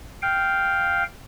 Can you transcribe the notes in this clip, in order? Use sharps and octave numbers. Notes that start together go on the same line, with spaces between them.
F5 G5